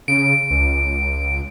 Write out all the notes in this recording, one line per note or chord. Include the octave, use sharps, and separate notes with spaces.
C#3 D7
C#2